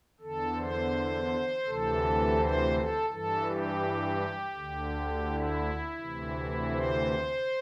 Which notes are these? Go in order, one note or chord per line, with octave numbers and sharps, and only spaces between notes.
E2 D3 A4
C5
D2 C3 E3 A4
C5
A4
G2 E3 A4
G4
D2 D3
E4
D2 C3 E3
C5